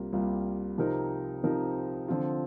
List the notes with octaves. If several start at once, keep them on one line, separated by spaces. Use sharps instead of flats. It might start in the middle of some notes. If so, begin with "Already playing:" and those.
Already playing: C2 C3 G3 A#3 F4
C2 C3 G3 A#3 F4
C3 F3 C4 D#4 A#4
C3 F3 C4 D#4 A#4
D3 F3 C4 F4